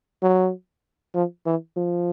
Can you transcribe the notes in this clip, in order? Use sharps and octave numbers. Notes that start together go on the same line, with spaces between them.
F#3
F3
E3
F3